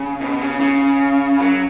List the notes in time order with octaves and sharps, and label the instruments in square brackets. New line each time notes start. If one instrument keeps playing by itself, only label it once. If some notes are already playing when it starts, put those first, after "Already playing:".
Already playing: [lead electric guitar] C#3
B2
C#3
C#3
F#3